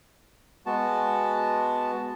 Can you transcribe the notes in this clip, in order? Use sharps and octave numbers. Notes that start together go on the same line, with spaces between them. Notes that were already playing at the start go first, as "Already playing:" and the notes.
G#3 B3 F#4 A5